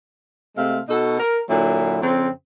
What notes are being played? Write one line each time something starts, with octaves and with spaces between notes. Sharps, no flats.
C3 G#3 A3 F5
B2 D#4 F#4 A4
A#4
A#2 D3 F#3 E4
F2 C#3 C4